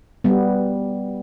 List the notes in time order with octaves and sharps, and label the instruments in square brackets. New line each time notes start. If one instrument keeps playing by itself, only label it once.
[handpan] G3 B3